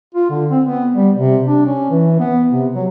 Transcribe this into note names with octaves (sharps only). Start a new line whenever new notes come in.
F4
D3
C4
B3
G3
C3
D4
C#4
E3
B3
C3
F#3